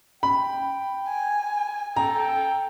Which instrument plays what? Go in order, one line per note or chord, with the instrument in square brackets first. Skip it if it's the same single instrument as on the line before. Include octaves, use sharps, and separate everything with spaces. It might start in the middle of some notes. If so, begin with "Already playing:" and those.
[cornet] G5 [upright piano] B5
[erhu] G#5
[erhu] A4 [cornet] G5 [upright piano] A#5